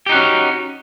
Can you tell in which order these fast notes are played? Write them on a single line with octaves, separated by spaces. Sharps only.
G4 D#4 F#4 C#4